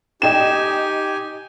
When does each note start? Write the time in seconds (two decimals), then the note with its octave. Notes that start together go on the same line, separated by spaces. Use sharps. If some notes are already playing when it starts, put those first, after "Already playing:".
0.22 D#4 G4 D#5 G5 G#5 E7